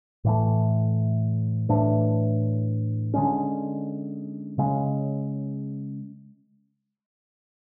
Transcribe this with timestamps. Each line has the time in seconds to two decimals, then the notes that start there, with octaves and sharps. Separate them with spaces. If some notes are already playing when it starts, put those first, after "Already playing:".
0.24 A2 E3 A3
1.69 A2 E3 A3 D4
3.14 D3 G#3 C#4
4.58 C#3 G#3 C#4